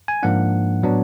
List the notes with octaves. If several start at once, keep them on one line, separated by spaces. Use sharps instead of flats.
G#5
G#2 F3 A#3 D4 F#5
A2 F#3 B3 D4